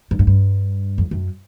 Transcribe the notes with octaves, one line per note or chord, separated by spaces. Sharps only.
G2
G#2
G2
F2
F#2